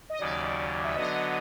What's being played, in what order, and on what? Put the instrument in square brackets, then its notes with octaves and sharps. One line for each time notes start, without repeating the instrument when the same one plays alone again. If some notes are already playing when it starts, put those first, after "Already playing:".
[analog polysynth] D#5
[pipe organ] D#2 C#3 F#3 [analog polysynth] D5
[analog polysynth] E5
[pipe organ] D3 F#3 B3 [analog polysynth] D#5